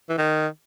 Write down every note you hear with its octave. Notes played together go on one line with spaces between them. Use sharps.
E3
D#3